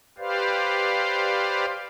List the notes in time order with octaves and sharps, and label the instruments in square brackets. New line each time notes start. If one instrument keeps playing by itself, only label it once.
[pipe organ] G4 B4 C5 D5 F5